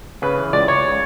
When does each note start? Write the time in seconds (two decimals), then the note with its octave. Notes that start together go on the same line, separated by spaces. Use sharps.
0.22 C#3 B4
0.37 E3
0.53 C#2 D5
0.68 C#2 C#5
0.85 C#3